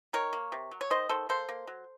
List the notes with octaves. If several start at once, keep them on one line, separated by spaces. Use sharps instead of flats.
D#3 A#4 C#5
A#3
C3
F#3
C#5
D#3 C5 D#5
D#3 A4 C5
A#3 A4 C5
A#3
F#3